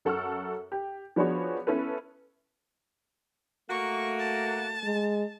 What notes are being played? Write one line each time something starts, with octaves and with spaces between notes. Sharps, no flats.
F#2 A4 F#5 C#6 E6 F6
G4
F3 B3 D4 F#4 G#4 C#5
B3 C#4 E4 A4 B4
A3 A#3 F#4 C#6
A5
G#3